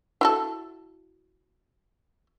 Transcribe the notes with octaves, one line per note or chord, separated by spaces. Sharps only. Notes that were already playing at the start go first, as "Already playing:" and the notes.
E4 F#4 A4